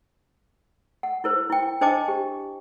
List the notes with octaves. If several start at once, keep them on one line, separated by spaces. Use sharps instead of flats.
F#5
E4 A#4 C5
E4 G5
D4 C5 D#5 G5 A5 D6
G4